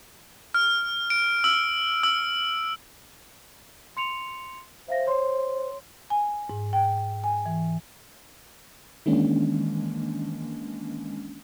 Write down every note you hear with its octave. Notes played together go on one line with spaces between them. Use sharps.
F6
D7
E6
E6
C6 C#7 F7
C5 E5 F5 A#6
C#5 C6
G#5
G#2
G5
G#5
E3
D#3 E3 G#3 A#3 C#4 D4